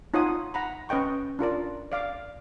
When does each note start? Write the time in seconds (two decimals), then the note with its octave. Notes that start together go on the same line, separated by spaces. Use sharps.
0.14 D#4 F4 C#5 F#5 G#5 D#6
0.54 F#5 A#5 B5
0.89 C#4 B4 D#5 G5 C#6
1.39 D4 F4 A#4 D5
1.92 D5 F5 D6